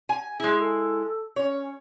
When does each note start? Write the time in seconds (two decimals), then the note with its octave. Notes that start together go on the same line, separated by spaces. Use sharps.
0.09 G#5
0.40 G#3 E4 G#4
0.59 A4
1.36 C#4 C#5